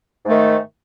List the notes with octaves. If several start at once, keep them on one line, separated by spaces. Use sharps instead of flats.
G#2 D#3 A3